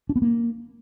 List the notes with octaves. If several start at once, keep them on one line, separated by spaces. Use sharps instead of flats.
D4
B3
A#3